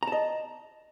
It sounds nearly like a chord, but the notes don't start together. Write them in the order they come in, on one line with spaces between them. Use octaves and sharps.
A#5 A5 D#5